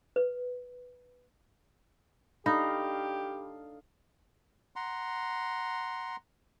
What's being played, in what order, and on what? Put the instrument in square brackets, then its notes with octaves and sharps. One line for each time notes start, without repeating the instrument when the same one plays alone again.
[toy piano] B4
[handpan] D4 A4 F5 [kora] D#4 [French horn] G4 [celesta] B5
[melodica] F#5 A#5 C6